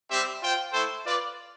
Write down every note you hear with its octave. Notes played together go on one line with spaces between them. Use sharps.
G3 C4 G4 C5 E5
F4 C5 G5
A3 E4 A4 C5
F4 B4 D5